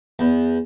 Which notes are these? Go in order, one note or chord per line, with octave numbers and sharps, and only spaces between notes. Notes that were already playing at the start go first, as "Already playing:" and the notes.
E2